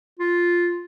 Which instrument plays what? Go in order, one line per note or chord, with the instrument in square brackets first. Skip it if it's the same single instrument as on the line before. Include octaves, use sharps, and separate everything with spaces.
[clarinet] F4